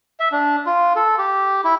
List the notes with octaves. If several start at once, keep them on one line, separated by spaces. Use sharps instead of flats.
E5
D4
F4
A4
G4
E4